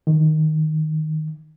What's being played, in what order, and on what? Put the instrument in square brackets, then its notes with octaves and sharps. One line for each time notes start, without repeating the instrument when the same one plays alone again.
[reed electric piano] D#3